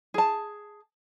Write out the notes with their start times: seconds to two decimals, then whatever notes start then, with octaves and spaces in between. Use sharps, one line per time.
0.14 G#4 A5